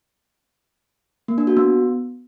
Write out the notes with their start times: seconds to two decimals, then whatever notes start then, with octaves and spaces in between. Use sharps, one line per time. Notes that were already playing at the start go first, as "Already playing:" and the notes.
1.28 A#3
1.38 D4
1.47 F#4
1.57 B3